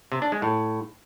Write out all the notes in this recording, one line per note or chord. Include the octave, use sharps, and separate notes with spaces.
C3
D4
G#3
A2